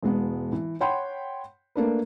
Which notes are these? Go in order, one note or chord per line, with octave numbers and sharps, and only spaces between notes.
E1 G#3 B3
E3
C#5 F#5 G5 B5 C6
A3 A#3 D4 B4